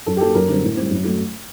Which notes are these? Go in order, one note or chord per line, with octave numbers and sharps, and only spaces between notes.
F#2 A4
G4
F#3 A#3 A4
F#2 A#4
D3 G3 C4
A2
G3 C4
F#2
F#3 A3